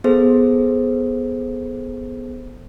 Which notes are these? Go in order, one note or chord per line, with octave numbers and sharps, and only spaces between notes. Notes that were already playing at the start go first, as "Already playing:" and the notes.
B3 G#4 A4 C5